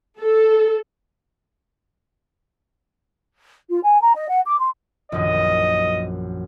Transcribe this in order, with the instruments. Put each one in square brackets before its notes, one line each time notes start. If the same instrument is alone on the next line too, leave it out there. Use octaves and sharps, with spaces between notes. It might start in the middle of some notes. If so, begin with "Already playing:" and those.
[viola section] A4
[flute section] F4
G#5
A#5
D#5
F#5
D6
C6
[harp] A#1 F#2 D#3 [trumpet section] D#5